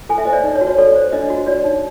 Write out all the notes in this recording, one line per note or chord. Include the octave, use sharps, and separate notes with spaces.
A4 G#5
E5
C5 D#5
D5
D#4
C#5
F#4
C#5
A4 D5
C5
D4 D#5
F#4
C#5 D5
D#4